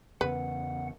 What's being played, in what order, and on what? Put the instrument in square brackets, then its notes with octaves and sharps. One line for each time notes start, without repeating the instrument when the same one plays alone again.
[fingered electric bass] E2 C#3 B3 [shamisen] B4 [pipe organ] F#5